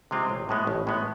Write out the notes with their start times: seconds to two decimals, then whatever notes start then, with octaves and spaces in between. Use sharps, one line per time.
0.11 C3 G#3 C4 F4
0.29 A1
0.49 A2 G#3 B3
0.67 A1
0.87 A2 G#3 B3